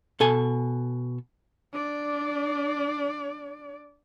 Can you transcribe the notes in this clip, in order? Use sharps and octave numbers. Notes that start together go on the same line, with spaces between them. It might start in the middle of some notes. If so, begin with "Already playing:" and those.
B2 A4 G#5
D4 D5